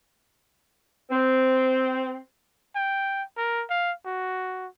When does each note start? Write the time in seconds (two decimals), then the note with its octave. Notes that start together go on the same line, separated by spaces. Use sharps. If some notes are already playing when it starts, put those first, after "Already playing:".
1.10 C4
2.76 G5
3.37 A#4
3.70 F5
4.06 F#4